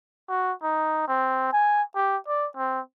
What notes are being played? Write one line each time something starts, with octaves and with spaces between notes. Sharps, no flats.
F#4
D#4
C4
G#5
G4
D5
C4